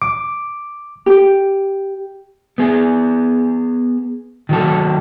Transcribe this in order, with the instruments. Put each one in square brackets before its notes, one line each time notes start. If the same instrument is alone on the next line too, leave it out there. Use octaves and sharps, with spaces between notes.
[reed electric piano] D6
[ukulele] G4
[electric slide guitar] B3 G#4
D#3 F#3 A4